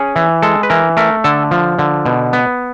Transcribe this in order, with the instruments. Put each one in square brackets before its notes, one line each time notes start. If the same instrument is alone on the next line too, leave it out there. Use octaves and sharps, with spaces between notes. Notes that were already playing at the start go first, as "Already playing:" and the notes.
Already playing: [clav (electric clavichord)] C#4 G#4
E3
G#3 A4
B4
E3 A#4
A3 A#4
D3 A4
F3
D3
B2
B3